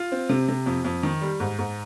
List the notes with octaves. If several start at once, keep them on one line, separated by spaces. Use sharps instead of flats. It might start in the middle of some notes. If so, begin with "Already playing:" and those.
Already playing: F4
C4
C3
C3
F2
F2
D#3
G3
G#2
G#2